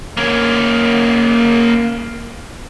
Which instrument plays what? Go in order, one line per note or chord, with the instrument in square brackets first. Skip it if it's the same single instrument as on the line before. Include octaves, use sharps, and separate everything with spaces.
[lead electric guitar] A#3 C#4